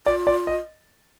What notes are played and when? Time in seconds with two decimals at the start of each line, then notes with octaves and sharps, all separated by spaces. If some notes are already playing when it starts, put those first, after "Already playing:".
0.06 F4 D5
0.27 D5
0.47 D#5